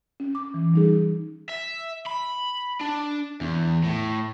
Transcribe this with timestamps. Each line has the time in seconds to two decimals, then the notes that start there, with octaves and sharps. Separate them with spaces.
0.20 C#4
0.35 D6
0.54 E3
0.74 G3 D#4 G#4
1.49 E5
2.07 B5
2.81 D4
3.41 E2
3.84 A2